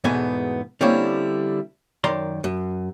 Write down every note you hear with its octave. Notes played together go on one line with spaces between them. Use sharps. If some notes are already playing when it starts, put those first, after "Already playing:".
E2 G#2 B2 A3 B3 G#5
D3 G3 A#3 C4 C#4 E4
F#2 D#3 D5 A#5 C6
F#2